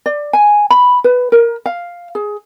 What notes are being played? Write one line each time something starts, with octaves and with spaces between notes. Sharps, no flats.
D5
G#5
B5
B4
A#4
F5
G#4